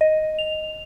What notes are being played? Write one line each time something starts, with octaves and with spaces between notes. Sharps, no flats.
D#5
F7